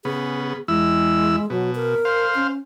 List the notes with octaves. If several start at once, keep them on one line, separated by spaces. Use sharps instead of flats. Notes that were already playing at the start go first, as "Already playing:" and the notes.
C#3 B3 G#4
E2 G#3 E4 E6
B2 F#3
A#4
C5 F5
C#4